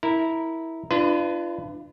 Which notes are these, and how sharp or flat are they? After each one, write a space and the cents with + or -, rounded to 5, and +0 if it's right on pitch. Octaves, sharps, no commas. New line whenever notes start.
E4 -15 A#4 +0
D4 +25 F4 -30 B4 +25